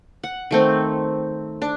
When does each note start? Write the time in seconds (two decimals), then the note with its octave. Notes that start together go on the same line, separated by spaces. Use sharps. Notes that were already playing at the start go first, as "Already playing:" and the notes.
0.24 F#5
0.51 D#3 A3 C4
1.62 D4